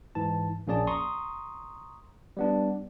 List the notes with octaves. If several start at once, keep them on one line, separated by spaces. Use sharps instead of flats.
G#2 E3 A5
A#1 A#3 C#4 G#4 D5 A5
A#5 C6 C#6 D#6
G3 B3 D4